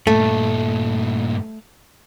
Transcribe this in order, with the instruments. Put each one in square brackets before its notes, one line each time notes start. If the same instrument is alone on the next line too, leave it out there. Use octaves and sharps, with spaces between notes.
[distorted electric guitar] G2 A#2 [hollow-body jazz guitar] A3